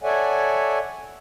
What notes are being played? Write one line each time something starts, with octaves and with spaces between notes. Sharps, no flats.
A4 C#5 D5 E5 F#5 G#5